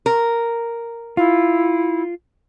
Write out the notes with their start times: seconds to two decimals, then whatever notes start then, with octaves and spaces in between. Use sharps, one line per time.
0.06 A#4
1.17 E4 F4